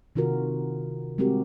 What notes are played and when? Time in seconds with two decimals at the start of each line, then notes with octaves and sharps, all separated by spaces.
0.16 C3 D#3 F4 F#4 A#4
1.18 G3 G#3 C4 F#4 G4 A#4